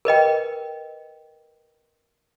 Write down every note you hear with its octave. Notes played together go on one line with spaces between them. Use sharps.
A#4 B4 D#5 G5